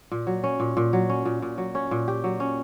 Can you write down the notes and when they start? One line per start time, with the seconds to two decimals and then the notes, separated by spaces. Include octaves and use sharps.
0.12 A#2
0.27 F#3
0.44 C#4
0.60 A#2
0.77 A#2
0.93 F#3
1.09 C#4
1.25 A#2
1.42 A#2
1.58 F#3
1.75 C#4
1.91 A#2
2.08 G4
2.24 F#3
2.40 C#4